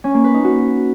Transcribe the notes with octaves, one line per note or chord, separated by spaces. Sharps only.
C#4
A#3
B4
D#4
F#4